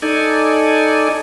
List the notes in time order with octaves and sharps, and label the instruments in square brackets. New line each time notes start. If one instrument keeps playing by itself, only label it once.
[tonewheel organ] D#4 A4 D5 G#5